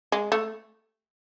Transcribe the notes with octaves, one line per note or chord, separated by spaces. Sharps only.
G#3
A3